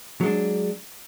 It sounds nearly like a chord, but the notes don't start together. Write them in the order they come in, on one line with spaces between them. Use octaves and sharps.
F#3 G#3 D4